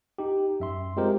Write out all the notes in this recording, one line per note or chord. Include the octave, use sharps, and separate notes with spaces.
D#4 G4
F#2 E5 C6
G#3 C4 F4 G4 A#4 C5